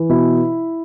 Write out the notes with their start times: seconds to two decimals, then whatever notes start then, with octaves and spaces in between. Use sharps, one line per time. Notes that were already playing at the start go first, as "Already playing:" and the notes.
Already playing: E3
0.09 B2 E4